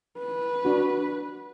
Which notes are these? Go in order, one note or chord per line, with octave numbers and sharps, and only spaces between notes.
B4
D4 F#4